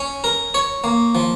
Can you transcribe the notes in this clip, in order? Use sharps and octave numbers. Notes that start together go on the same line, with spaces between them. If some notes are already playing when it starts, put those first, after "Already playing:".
Already playing: C#4
A#4
C#5
A#3
F3